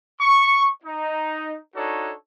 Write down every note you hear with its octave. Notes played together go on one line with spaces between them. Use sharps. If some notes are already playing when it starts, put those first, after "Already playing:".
C#6
D#4
D4 D#4 F#4 A4 C#5